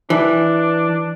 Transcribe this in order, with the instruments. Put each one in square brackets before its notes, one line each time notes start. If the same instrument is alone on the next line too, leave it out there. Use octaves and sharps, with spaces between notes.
[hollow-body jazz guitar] E3 [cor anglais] D4